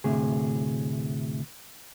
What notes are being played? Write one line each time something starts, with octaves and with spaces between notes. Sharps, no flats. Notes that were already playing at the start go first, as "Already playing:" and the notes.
D2 A2 C3 G#4